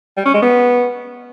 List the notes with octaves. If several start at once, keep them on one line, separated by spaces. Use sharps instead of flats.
G3
C#4
G#3
B3